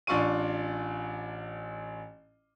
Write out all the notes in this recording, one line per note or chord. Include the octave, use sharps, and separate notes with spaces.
A1 D4 F4 C#6 D#7